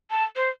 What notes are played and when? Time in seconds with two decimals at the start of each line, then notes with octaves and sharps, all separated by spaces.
0.11 A5
0.36 C5